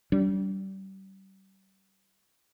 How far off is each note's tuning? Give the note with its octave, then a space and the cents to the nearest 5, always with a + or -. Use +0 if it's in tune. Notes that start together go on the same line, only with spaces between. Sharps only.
G3 -30 D4 -40